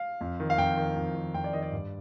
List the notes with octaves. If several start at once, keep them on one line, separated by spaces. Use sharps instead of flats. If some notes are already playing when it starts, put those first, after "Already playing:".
Already playing: F5
F2
D#3
F5
F2 G5
D#3
F2
D#3
F2 G5
D5
D#3 D#5
D5
G2